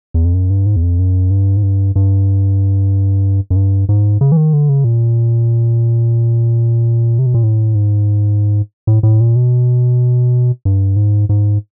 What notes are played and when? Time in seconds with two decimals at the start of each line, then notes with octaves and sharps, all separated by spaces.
0.14 E2
0.25 F2
0.34 F#2
0.50 G2
0.66 G#2
0.76 E2
0.83 F2
0.99 F#2
1.31 G2
1.57 G#2
1.63 G2
1.96 G2
3.50 F#2
3.56 G2
3.89 G#2
4.21 C#3
4.32 E3
4.37 D#3
4.53 D3
4.69 C#3
4.84 A#2
7.19 C3
7.26 B2
7.34 A#2
7.43 A2
7.75 G#2
8.87 A2
9.03 A2
9.20 A#2
9.36 B2
10.65 G2
10.96 G#2
11.29 G#2